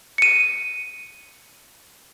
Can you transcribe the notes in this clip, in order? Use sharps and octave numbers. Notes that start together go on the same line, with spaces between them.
C#7 D#7